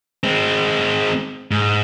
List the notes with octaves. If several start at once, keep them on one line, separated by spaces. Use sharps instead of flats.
G#3 C4
G#2